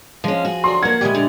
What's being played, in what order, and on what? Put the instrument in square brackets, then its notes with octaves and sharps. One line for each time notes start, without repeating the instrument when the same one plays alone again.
[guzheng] F3 [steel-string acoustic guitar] G#3 C#4
[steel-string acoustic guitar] F#4 G#4
[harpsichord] D2 F#3 D4 [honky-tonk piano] C6
[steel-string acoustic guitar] A#3 F#5 [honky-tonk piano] G#6
[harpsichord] A#1 G3 G#5 [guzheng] G#3 E4 G4
[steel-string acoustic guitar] D3